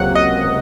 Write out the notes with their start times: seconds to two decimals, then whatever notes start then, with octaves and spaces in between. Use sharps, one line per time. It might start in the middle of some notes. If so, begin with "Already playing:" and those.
Already playing: C#2 C3 F#3 A#3 F#5
0.15 D#5